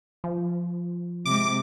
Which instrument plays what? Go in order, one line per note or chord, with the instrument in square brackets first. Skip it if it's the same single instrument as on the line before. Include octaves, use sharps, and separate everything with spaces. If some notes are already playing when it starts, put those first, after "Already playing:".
[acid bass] F3
[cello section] C3 G#3 [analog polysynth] D6